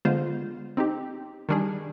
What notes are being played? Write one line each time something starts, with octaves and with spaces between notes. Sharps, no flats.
D3 G#3 B3 F4 C5
C4 D#4 G4
D#3 G3 D4 G#4